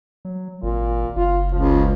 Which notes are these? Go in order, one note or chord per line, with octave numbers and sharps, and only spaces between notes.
F#3
G#1 A#2
F#1 F4
C#2 F3